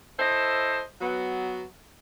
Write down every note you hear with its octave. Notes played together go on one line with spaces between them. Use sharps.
E4 A4 C5 D#5
F#3 B3